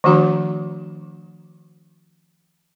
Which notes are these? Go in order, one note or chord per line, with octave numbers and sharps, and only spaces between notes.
D#3 F3 A3 D4 F#4 A#5